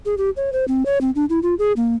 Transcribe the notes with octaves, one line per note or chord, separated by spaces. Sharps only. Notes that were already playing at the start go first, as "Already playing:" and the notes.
G#4
G4
C#5
C5
C4
C#5
C4
D4
E4
F4
G#4
A#3